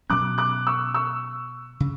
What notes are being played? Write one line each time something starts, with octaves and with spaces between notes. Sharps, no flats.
B2 F#3 C#4 D6 F#6
D6 F#6
C#6 E6
C#6 E6
C#3